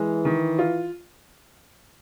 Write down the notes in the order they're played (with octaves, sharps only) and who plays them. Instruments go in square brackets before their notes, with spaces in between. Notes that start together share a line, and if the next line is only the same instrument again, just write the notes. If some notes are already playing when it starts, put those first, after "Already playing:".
Already playing: [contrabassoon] E3 [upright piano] G#3
[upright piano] D#3
F4